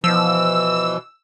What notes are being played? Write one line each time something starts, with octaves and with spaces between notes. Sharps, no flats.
B2 E3 F3 E6